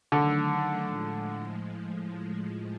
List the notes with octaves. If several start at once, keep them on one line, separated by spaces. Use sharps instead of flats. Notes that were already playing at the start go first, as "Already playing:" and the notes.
D3 D#3 F#3 A3 D4
A2 F3 G#3